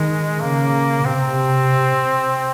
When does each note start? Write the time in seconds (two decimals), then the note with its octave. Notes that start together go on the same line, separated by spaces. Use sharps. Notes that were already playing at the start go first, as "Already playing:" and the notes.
Already playing: D#3 G#3
0.39 C#3 A#3
1.05 C3 C4